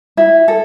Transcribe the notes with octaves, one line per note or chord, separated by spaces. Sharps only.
E4
A4